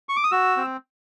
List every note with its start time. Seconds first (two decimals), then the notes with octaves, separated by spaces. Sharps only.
0.09 C#6
0.16 D6
0.24 D#6
0.31 F#4 E6
0.57 C4